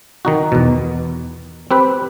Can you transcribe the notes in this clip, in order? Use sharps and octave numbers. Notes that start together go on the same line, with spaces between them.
D#3 D#4 F#4
E2 B2
C4 G4 B4